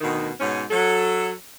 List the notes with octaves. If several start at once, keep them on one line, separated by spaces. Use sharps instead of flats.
D2 B2 D#3
G#2 B2 C#4
F#3 A4